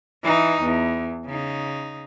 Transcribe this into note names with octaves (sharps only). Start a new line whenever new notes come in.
E3 D#4
E2
C#3 D#4